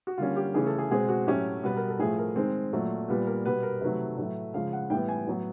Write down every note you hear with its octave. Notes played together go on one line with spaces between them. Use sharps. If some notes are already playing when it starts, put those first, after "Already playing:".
F#4
D3 G3 A#3 C#4 F4
G4
C#3 E3 A3 C#4 G#4
A4
G#4
B2 G#3 C4 G#4
F#4
A2 F#3 A3 C#4 G4
B2 G3 B3 B4
A#4
A4
A2 F3 A3 G#4
A#4
D#3 G#3 C4
A#2 F#3 A3
A#2 G3 B3 B4
A#4
B2 G3 B3 B4
A#4
C3 D#3 F#3 A3 B4
A2 F#3 A3
C#3 F3 G#3 F5
F#5
A2 E3 G3 B3 G5
G#5
A2 F#3 B3